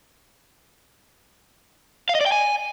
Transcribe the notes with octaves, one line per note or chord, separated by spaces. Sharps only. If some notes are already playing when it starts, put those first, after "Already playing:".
F5
D#5
D5
G5
G#5